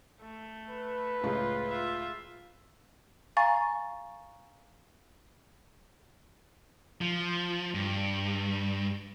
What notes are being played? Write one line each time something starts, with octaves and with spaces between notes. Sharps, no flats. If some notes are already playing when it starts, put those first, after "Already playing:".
A3
B4
C#2 A2 G#3 F4
F4 E5
F5 G#5 A#5 C#6 A6
F3
G2